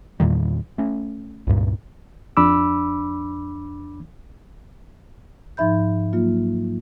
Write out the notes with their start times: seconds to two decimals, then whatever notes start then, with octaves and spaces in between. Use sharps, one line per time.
0.20 E2 A#2 D#3 G3
0.78 A3 C#4
1.47 C#2 G2 A#2
2.37 F2 D4 B5 D6 E6
5.57 G#2 F3 D#4 E5 B5 G6
6.13 F#3 A#3 F4